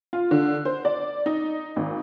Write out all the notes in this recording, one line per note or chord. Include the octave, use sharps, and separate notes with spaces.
F4
D3
C5
D5
D#4
G#1